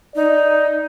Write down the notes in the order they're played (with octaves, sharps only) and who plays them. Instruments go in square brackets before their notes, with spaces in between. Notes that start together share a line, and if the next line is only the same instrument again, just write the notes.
[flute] D#4 [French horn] D5